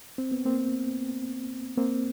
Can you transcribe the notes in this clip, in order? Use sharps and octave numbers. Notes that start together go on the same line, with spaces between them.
C4
B3
A#3 C4
A#3 C4